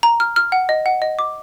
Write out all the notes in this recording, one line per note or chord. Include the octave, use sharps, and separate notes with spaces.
A#5
F6
F6
F#5
D#5
F#5
D#5
D6